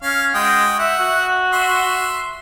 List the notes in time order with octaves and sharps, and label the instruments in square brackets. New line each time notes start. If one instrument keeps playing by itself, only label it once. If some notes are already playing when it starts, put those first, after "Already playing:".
[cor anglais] C#4 [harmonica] F5
[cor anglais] G#3 [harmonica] F#4 G5 D#6
[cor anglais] E5 [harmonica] F#5
[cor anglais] F#4
[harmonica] E5 C6